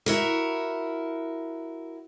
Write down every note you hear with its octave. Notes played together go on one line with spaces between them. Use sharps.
E4 F#4 A#4